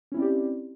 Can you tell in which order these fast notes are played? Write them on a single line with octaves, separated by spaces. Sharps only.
C#4 E4 C4 D5 G4